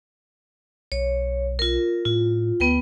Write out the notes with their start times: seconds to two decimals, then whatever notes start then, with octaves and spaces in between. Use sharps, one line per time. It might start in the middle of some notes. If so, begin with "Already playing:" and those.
0.92 B1 C#5
1.59 F4 A#4
2.05 A2 F4
2.60 D2 B3 B4 G5